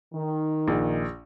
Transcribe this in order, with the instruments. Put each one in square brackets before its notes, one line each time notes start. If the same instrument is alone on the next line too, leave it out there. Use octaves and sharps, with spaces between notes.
[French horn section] D#3
[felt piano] A#1